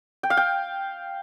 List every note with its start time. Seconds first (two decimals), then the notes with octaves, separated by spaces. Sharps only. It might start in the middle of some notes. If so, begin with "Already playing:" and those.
0.23 G5
0.30 F5
0.37 G5